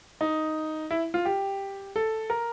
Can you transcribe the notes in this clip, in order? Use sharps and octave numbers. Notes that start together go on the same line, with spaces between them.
D#4
E4
F4
G4
A4
A#4